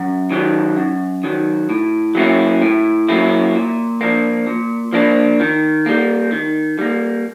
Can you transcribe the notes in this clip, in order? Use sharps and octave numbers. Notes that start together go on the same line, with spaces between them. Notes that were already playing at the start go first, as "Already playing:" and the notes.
Already playing: F#2
D#3 F#3
F#2
D#3 F#3
A2
F#3 A#3 C#4 E4
A2
F#3 A#3 C#4 E4
A#2
F3 A#3 D4
A#2
F3 A#3 D4
D#3
G3 A#3
D#3
G3 A#3